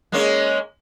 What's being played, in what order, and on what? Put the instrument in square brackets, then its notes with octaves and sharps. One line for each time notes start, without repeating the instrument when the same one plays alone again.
[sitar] G#3 A#3 C#4